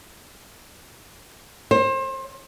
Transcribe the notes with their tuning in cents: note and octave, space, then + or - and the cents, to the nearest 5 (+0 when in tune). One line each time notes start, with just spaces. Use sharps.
C5 +30